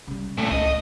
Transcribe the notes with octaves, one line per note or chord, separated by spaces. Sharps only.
C#3 G3
A#2 A3
C#2 D#5